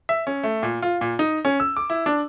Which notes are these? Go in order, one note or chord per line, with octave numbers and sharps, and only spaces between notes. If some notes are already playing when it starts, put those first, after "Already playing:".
E5
C#4
A3
A#2
F4
A#2
D#4
C#4
E6
D6
E4
D4